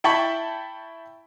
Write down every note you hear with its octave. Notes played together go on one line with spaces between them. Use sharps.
E4 G5 A5 B5 C#6